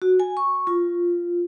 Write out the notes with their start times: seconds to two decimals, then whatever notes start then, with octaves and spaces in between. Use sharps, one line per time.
0.02 F#4
0.20 G#5
0.37 C#6
0.67 F4